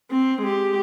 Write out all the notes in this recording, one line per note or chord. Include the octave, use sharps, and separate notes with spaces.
C4
G#3 G4